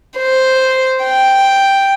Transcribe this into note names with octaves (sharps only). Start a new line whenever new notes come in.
C5
G5